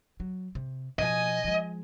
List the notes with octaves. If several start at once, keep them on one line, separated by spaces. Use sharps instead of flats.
F#3
C3
B2 F3 D#5 G#5
F3 G#3